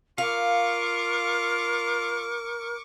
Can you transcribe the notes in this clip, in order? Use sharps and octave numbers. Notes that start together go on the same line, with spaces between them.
F4 A#4 F5 C#6 D6